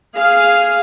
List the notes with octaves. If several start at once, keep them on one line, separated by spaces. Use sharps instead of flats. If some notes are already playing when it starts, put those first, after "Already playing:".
G#4 F5